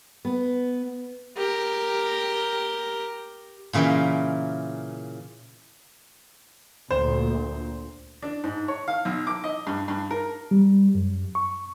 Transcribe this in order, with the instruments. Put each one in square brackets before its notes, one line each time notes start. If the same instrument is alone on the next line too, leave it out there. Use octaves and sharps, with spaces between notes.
[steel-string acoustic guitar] B3
[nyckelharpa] G4 A#4
[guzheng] A#2 C#3 E3 A#4 G5
[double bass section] D2 A#2 [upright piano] C5
[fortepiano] D4
G#2
C#5
F5
B1
D6
D#5
G2
G2
A#4
[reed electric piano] G3
F#2
C#6